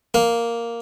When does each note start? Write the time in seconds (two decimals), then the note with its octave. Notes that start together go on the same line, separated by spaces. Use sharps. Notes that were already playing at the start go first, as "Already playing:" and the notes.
0.14 A#3